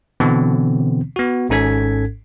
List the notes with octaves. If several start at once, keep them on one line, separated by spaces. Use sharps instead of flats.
B2 D3 E3 B3 C4
B3 F#4
G#1 G#2 C#4 A4 G#6 B6